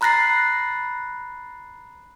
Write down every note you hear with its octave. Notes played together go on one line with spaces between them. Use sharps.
A#5 B5 F#6 A6 A#6 C7